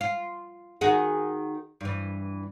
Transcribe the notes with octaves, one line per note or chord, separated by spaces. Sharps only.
F4
D#3 F#4 G#4
G2 E3